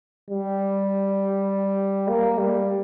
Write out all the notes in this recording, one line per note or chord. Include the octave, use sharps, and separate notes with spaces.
G3
A#3
G3